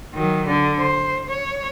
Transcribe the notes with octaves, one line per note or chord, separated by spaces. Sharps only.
D#3 F#3
D3
C5
C#5